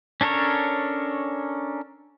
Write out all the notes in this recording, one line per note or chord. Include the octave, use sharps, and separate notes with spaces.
C#4 D4 A4 A#4 C#5